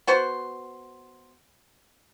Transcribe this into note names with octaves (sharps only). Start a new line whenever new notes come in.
B3 F#4 C5